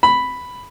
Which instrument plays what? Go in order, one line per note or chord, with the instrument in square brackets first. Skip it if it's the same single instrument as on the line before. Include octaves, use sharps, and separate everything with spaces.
[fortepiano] B5